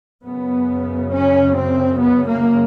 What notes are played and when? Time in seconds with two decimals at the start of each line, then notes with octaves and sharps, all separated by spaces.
0.24 F#2 C#3 B3
1.12 C#4
1.56 C4
1.99 B3
2.28 A#3